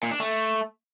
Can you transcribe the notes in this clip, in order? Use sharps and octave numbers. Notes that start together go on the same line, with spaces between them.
A#2
D4
A3